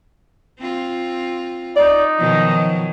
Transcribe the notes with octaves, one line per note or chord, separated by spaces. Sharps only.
C4 F4
D#4 D5
B2 D#3 F3 F#3